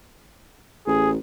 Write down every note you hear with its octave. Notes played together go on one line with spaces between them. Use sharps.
A1 G#4